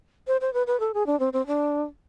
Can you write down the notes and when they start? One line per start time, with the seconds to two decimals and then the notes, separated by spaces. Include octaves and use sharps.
0.27 C5
0.41 C5
0.54 B4
0.67 B4
0.80 A4
0.94 G#4
1.06 D4
1.20 C4
1.33 C4
1.47 D4